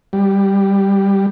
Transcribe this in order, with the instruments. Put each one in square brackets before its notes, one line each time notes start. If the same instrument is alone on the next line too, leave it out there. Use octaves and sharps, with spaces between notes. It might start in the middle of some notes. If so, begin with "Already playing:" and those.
[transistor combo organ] G3